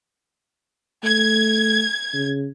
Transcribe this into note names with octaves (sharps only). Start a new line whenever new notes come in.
A3 G#6
C#3